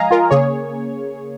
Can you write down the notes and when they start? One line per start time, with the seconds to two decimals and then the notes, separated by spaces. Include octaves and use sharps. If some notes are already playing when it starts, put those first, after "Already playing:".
Already playing: F3 G#3 D#5 F5 G#5 A#5
0.11 F4 A#4
0.31 C#3 A#3 G#4 C#5